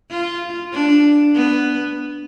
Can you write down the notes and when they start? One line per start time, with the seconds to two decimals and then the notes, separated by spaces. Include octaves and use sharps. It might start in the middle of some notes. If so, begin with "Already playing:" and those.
0.11 F4
0.73 D4
1.35 B3